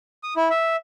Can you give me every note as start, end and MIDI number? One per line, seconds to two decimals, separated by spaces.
0.23 0.34 87
0.36 0.49 64
0.50 0.76 76